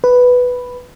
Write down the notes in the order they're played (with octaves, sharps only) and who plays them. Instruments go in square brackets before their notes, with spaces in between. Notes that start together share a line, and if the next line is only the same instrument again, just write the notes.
[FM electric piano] B4